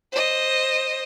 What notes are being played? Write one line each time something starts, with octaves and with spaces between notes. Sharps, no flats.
C5 D#5